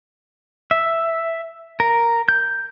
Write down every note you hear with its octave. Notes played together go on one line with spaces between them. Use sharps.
E5
A#4
G6